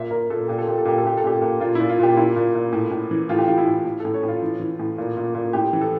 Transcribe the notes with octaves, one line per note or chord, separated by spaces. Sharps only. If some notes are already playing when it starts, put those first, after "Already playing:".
Already playing: A#2 E5
A#2 A#4
A#2 A4
A#2 G4
A4
A#2 G4
A4
A#2 G4
A4
A#2 G4
A4
A#2 G4
A#2
A#2 F4
A#2 E4
F4
A#2 G4
A#2 E4
A#2
A#2
A2
A2
E3
A2 F4
G4
E3 F4
E4
A2
A2
A2 A4
C#5
A2
F4
E3
E3
A2
A#2
A#2
A#2
A2 G4
E3
A4